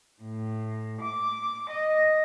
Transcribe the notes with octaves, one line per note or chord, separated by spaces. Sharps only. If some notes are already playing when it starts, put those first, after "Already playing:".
A2
D6
D#5